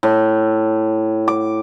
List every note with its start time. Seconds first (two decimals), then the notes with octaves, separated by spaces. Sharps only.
0.03 A2
1.28 D6